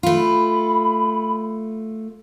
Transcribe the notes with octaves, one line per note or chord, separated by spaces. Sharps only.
A3 F4 B5